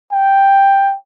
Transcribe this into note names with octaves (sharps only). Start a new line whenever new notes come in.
G5